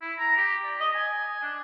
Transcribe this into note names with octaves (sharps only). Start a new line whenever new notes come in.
E4
A#5
G4
D5
D#5
G#5
D4